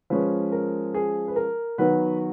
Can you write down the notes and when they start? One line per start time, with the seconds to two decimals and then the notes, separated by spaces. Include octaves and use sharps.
0.10 F3 G#3 C#4 B4
0.52 A#4
0.94 G#4
1.28 B4
1.36 A#4
1.78 D#3 F#3 B3 B4